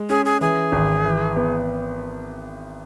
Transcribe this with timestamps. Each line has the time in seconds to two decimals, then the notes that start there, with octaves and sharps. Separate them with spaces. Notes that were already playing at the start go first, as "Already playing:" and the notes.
Already playing: G#3
0.09 C#4 G#4
0.25 G#4
0.41 E3 G#4
0.72 G#1
1.05 E3
1.36 B3